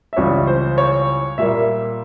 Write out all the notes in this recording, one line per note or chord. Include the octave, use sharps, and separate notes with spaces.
E5
C#2 C#3 E3 G3 C#5
C5
C#5
A#2 G3 A#3 E5